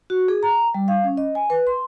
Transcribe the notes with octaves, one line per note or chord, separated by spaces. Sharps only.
F#4
G#4
A#5
G3
F5
C#4
D#5
G#5
B4
C6